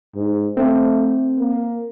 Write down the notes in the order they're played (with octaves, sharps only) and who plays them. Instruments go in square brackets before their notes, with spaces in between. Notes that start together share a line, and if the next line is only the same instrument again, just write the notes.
[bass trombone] G#2
[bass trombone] A3 [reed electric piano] C4
[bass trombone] A#3